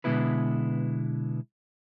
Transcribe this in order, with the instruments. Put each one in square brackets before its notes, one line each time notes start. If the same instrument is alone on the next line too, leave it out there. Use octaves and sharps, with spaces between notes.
[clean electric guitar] B2 D3 G#3 B3 E4 B4